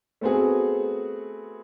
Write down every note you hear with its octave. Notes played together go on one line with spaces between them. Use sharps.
A3 B3 C4 F#4 G#4